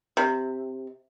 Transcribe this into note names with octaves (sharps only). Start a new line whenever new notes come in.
C3